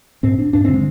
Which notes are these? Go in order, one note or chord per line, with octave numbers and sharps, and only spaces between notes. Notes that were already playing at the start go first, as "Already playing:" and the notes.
G#2 C4
D4
G2 D4
D3 C4
G#3